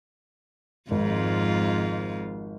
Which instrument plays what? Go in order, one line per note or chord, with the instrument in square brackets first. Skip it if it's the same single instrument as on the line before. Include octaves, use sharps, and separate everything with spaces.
[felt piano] G#1 [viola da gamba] F2 G#2 F4